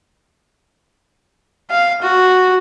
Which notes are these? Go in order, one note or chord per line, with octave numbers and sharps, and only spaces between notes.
F5
F#4